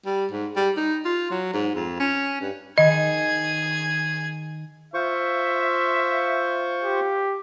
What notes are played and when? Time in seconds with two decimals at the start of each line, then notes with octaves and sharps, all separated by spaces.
0.06 G3
0.31 G#2
0.56 G3
0.77 D#4
1.05 F4
1.30 F#3
1.53 G#2
1.75 F2
2.00 C#4
2.41 G2
2.78 D#3 G#4 D#5 G#6
4.94 F4 C5 E5 C#6
6.84 G4